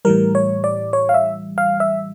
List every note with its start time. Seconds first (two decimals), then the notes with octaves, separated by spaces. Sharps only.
0.05 A2 E3 G3 A#4
0.35 C#5
0.64 D5
0.93 C#5
1.09 F5
1.14 E5
1.58 F5
1.80 E5